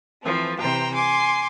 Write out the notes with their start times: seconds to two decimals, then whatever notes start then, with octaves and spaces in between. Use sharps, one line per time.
0.23 E3 F3 A3 C4
0.59 C3 E3 C5 G5 A#5
0.94 G#5 C6 D6